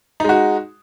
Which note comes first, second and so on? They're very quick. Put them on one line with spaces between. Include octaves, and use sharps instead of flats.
D#4 G#3 F#4